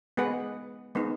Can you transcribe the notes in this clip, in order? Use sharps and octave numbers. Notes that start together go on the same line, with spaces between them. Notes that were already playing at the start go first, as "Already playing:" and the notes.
G#3 B3 G#4 B4 F#5
G#3 B3 D#4